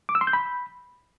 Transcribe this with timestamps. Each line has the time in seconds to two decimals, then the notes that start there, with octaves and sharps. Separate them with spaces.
0.09 D6
0.15 E6
0.21 C6
0.27 G6
0.33 B5